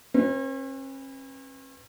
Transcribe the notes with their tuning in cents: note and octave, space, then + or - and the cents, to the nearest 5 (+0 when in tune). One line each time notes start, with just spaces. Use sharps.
C#4 -45 B4 +0